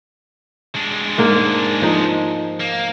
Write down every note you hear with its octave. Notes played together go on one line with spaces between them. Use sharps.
G#3 D4
G#2 A#3
F3 D#4
A#3